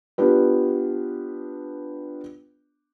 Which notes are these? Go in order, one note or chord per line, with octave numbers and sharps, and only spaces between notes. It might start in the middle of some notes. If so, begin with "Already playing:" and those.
B3 D4 F4 G4 B4